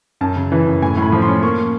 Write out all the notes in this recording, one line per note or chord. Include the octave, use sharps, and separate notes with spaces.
F#2 A5
C#3
E3
F#2
A2 G#5
A2
B5
F3
C6
C#4
A#3 C#6